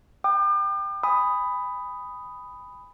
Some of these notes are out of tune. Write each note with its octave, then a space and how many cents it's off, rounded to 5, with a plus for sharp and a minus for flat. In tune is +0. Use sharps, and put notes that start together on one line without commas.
G5 +0 D6 +40
G#5 -30 B5 +10 D#6 +0